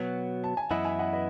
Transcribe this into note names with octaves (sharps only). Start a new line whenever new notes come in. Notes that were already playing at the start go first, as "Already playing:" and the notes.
Already playing: B2 F#3 B3
A5
G#5
F#2 E3 B3 E4 D#5 F#5
E5 G#5
D#5 F#5
B4 D#5